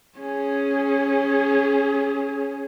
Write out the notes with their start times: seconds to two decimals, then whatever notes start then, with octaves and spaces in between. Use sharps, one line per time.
0.18 C#4 G#4